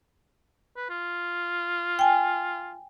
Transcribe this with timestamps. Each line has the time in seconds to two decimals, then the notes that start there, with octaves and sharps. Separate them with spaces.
0.76 B4
0.90 F4
1.99 G5 G#5